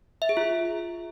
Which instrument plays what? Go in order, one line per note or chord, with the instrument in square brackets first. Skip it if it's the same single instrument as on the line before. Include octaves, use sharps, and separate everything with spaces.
[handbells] E5
G#4
F4